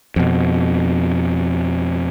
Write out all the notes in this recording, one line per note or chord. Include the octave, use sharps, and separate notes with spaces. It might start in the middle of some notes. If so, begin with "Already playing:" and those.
F2 B2